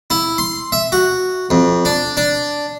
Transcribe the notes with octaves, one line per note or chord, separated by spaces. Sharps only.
E4
C6
E5
F#4
F2
D4
D4